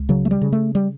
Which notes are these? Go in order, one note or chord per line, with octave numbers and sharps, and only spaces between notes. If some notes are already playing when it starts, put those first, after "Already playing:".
Already playing: C#2
C#3 F#3
A3
G3
C#3
A3
G3